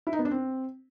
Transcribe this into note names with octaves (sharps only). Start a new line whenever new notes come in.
E4
D#4
B3
D4
C4